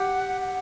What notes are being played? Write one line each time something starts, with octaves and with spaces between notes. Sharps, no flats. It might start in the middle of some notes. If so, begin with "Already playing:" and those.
Already playing: G4 F#5
F#5